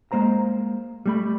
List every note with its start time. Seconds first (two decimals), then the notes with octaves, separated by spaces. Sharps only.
0.12 G#3 A#3 C5 A#5
1.06 G3 A3 B5